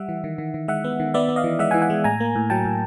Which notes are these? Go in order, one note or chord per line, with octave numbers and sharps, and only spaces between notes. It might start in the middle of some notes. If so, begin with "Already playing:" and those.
Already playing: G3 E5 F#5
E3
D#3
D#3
D#3
G#3 E5 F#5
B3
D#3
B3 D5 E5
B3
D#5 F5
E3
G#3 E5 F#5
F#5 G#5
E3
F#5 G#5
G#3
A2 G#5 A#5
A#3
A2
F#3 G5 A5
A2